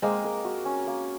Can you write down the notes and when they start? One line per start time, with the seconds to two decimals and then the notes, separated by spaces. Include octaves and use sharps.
0.02 G#3 A#3 C4
0.24 A#4
0.45 F#4
0.65 C#4
0.87 A#3